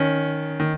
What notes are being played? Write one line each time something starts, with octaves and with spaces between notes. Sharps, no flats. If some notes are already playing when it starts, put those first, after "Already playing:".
Already playing: D#3 C#4
D#3